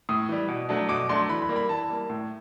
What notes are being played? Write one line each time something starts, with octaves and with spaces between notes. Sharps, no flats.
A2 D#6
E3 G3
B2
F#3 A3 D4
B2 D6
F#3 A3 D4 C6
E3 B5
B5
G3 A#3
B5
E3 A5
G3 A#3
A2